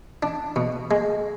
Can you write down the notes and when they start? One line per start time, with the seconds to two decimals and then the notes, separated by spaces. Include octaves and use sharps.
0.23 D4
0.56 B2
0.91 G#3